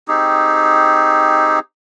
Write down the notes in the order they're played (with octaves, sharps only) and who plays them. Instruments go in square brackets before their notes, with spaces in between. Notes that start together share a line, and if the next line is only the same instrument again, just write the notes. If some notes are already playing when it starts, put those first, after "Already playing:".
[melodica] C4 D#4 G4 G#4